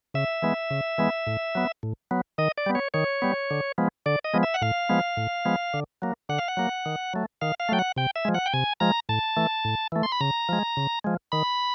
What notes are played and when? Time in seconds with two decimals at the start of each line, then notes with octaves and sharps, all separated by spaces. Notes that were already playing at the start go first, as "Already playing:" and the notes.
0.14 C#3 E5
0.42 E3 G#3 B3
0.71 C#3
0.98 E3 G#3 B3
1.27 A2
1.55 F#3 B3
1.83 A2
2.11 F#3 B3
2.38 D#3 D#5
2.58 D5
2.66 G3 B3
2.75 C#5
2.94 D#3 C#5
3.22 G3 B3
3.51 D3
3.78 F3 G#3 B3
4.06 D3 D5
4.24 D#5
4.34 F3 G#3 B3
4.43 E5
4.54 F#5
4.61 A2 F5
4.89 F3 G#3 B3
5.17 A2
5.45 F3 G#3 B3
5.74 D3
6.02 F#3 A#3
6.29 D3 F#5
6.38 F5
6.48 F#5
6.57 F#3 A#3
6.86 D#3
7.13 F#3 A3
7.41 D#3 F5
7.60 F5
7.69 F#3 A3 G5
7.79 F#5
7.96 C3 G5
8.16 E5
8.25 F3 G#3
8.35 F#5
8.46 G5
8.54 C3 G#5
8.80 F3 G#3 A#5
9.09 A2 A5
9.37 E3 A3
9.65 A2
9.92 E3 A3
10.03 C6
10.12 B5
10.21 C#3 A#5
10.49 F3 G#3
10.77 C#3
11.04 F3 G#3
11.32 D#3 B5